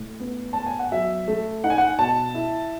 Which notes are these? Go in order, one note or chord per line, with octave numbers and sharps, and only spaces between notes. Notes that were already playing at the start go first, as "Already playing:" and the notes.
Already playing: A2 A3
B3
B3 A5
G#5
F#5
F#3 E5
A3
D#4 F#5
G#5
F#5
B2 A5
E4